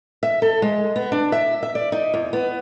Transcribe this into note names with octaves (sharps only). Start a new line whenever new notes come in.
E5
A4
G#3
B3
D4
E5
E5
D5
D#4
E2
B3